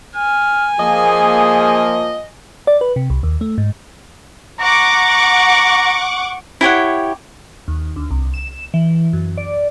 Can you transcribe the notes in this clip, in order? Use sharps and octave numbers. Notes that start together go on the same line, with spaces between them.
G#5 F6
F3 A#3 G#4 D#5
D5
B4
C3
C2
D#2
A3
G#2
F#5 A#5 C#6 D6
E4 G4 C#5 F#5
D#2
D2
C2
E7
E3
F#2
D5